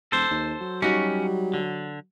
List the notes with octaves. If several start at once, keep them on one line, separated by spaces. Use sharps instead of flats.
E1 A4 C5
D#2
F#3
G3 C#4 D#4 F#4
D3